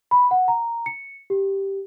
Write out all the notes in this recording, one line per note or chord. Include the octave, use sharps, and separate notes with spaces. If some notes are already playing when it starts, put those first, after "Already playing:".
B5
F#5
A#5
C#7
G4